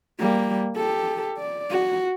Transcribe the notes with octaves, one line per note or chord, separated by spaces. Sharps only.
G3 A#3
G4 A4
D5
F#4